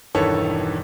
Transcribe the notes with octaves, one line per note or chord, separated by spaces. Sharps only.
E1 G2 D#3 E3 A4 C#5